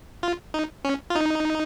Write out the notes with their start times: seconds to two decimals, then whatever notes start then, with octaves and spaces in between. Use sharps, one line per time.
0.23 F4
0.54 D#4
0.85 C#4
1.10 F4
1.16 D#4